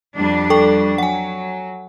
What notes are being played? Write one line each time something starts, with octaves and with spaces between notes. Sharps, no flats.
F2 G3 D4
A4 G5 C#6
F#3 F#5 G#5